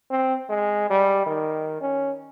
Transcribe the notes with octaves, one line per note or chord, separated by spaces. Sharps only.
C4
G#3
G3
D#3
C#4